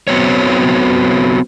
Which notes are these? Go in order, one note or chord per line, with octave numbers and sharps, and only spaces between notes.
F#3 B3 C4 C#5